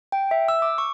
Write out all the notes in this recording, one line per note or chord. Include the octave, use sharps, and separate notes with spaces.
G5
E5
E6
D6
C#6